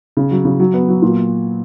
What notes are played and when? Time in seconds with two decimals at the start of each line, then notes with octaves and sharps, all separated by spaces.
0.17 C#3
0.31 F#3
0.45 C#3
0.60 F#3
0.74 B3
0.88 F#3
1.02 A#2